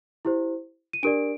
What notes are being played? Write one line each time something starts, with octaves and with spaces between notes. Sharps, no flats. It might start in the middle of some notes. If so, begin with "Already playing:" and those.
E4 G4 C5
D#7
D4 G4 A#4 D5 D7